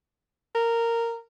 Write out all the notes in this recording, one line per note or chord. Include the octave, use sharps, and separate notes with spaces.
A#4